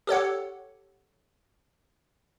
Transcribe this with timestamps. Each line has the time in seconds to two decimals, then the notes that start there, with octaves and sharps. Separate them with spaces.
0.07 G4 A4 C#5 F#5